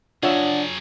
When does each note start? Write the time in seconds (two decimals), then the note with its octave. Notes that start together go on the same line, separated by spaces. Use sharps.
0.23 F#3 D4 F4 G#4 C#5 E5 F#5